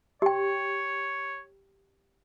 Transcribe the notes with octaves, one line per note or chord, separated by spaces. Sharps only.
G4 C#5 G5